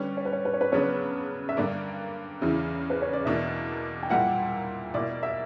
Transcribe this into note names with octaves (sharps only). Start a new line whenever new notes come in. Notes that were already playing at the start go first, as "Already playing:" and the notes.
Already playing: D3 G3 C#4 B4
C#5
B4
C#5
B4
C#5
B4
C#3 F#3 B3 D4 C#5
E5
G2 D3 A#3 D5
E2 C#3 E3
B4
C#5
D5
E2 B2 A#3 D4 E5
G5
A#2 G3 A#3 E4 F#5
B2 A#3 E4 D5
E5